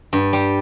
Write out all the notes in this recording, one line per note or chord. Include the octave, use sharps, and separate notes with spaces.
G2
G3